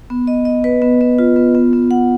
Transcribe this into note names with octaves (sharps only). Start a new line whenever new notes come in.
B3
D#5
D#5
B4
B3
B3
F4
B3
B3
B3
F#5